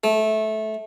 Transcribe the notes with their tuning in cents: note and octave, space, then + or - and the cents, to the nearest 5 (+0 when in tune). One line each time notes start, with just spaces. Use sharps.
A3 -15